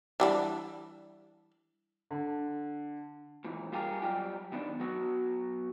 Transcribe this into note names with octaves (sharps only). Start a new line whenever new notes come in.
E3 G3 D4
D3
A#2 E3
G3 F4 G4 G#4 A#4
F#3 G3 F4 G5
D#3 B3 D4
F#3 B3 F#4